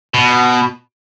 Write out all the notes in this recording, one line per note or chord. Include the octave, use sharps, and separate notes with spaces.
B2